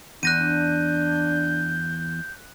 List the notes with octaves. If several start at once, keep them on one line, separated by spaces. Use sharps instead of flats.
E2 D4 F#6 G6 A#6 D#7